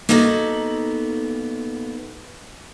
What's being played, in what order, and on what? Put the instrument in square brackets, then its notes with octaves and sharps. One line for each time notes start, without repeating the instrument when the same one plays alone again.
[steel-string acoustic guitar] A#3 B3 D#4 F#4 A4